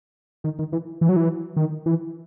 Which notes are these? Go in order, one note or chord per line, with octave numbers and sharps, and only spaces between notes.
D#3
D#3
E3
E3
F#3
E3
D#3
E3